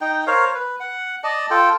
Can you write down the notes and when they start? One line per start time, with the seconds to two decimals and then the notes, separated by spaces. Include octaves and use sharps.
0.01 D#4 G5
0.27 A#4 C5 C#5 F5
0.55 B4
0.80 F#5
1.24 D5 D#5 A5
1.51 F4 A4 G5